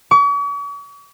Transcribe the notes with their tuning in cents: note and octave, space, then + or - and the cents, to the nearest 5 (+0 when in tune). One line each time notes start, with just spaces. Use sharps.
C#6 +45